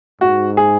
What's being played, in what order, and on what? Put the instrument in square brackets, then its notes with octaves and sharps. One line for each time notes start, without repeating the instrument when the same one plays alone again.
[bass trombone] G#2 [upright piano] F#4
[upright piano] G#4